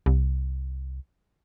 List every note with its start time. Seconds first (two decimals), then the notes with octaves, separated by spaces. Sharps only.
0.06 C2